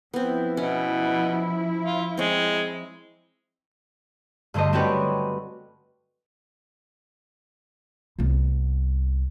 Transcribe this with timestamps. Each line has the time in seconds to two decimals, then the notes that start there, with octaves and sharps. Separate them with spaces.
0.14 F3 B3 C4 E4
0.57 B2 C#4
1.85 F4
2.17 G#3 C4 C#5
4.54 G2 D3 A3 C5 D#5
4.73 A3 C4 C#4 F#4 G4 B4
8.19 C2 B3